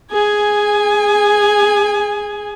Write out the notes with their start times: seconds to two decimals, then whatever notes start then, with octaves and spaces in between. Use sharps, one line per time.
0.12 G#4 G#5